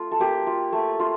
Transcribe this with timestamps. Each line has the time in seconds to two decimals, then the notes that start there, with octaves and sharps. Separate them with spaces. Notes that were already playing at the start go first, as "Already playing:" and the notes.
Already playing: A3 F4
0.11 A4
0.20 A#3 G4
0.47 F4
0.72 A3
1.00 F4